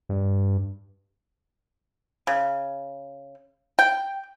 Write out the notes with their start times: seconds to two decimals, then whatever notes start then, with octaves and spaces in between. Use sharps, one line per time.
0.09 G2
2.27 C#3
3.79 G5